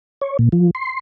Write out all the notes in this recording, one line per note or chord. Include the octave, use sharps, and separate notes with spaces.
C#5
A#2
F3
C6